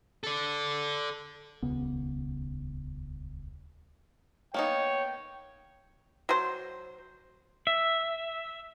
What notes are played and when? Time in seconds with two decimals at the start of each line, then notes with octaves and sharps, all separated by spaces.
0.24 A4 D5
1.62 D#1 C#2 C#3 B3
4.54 A#3 B3 D#4 C#5 G5
6.29 F#3 C5
7.67 E5